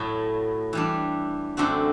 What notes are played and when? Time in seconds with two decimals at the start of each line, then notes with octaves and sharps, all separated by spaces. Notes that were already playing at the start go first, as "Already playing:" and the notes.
Already playing: A2 F#3 A3
0.73 E3 G3 D4
1.57 F#2 D3 A3 C4 F#4